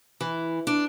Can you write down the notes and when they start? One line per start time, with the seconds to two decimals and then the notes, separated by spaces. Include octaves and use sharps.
0.21 E3
0.67 D4